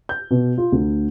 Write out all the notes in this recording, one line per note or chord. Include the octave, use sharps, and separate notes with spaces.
G6
B2
F4
D2